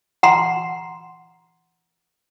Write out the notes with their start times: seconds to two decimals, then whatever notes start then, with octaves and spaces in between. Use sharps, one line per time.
0.23 F#5 A#5 C6